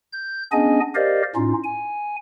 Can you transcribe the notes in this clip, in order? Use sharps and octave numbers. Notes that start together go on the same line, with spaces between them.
G6
B3 C#4 D4 G#4 D#5 G#5
G4 A#4 C5 D5 D#5 F5
A2 C#4 D#4 F4
G#5